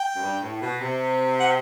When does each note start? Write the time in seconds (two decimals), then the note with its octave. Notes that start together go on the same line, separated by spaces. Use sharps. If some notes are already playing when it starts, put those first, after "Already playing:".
Already playing: G5
0.15 F#2
0.22 G2
0.41 A2
0.62 B2
0.81 C3
1.40 F#5